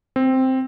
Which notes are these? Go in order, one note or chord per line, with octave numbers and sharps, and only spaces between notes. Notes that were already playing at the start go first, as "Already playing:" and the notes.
C4